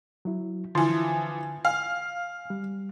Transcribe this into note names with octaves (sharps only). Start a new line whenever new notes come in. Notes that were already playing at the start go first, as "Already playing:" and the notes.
F#3 E4
D3 E3 F3 E4 C6
F5 G#5
G3